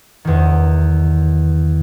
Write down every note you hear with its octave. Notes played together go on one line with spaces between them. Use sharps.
E2 D#3